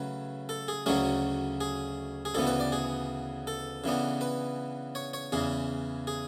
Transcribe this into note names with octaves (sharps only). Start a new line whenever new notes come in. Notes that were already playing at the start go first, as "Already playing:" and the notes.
Already playing: C#3 F#3 A3 B4
A4
G#4
D2 C#3 F#3 A3 C#4 G#4
G#4
G#4
D2 C#3 E3 B3 A4
B4
D5
G#4
A4
C#3 E3 B3 D4
B4
C#5
C#5
E2 C#3 E3 G#4
G#4